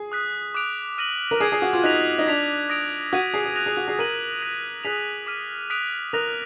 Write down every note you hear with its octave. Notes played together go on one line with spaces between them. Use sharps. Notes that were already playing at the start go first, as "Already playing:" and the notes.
Already playing: G#4
D#6 F#6 B6
D6 F#6 D7 F7
F6 A#6 D#7 F#7
A#4
G#4 D6 G#6 D7
G#4
F#4
F4
D#4 F#6 B6 F7
D#4
D4 G#6 B6 F7
D#6 A#6 D7 F7
F#4 D#6 G#6 B6 D#7
G#4
G#4
F#6 A#6 F7
G#4
F#4
G#4
A#4 D#6 A#6 D#7 F#7
F#6 B6 F7
G#4 F#6 B6 F7
D6 F6 B6 D#7
D#6 F#6 B6 D7 F7
A#4 D#6 F#6 A#6 F7